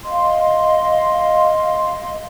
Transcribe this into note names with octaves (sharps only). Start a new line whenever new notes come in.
D#5 F5 C6